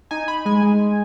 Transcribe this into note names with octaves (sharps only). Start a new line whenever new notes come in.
D#4 G#5
D#4 B5
G#3 G#5
G#3